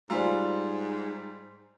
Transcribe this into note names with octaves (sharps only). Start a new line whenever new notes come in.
G#2 G3 F4 C5 G#5 A#5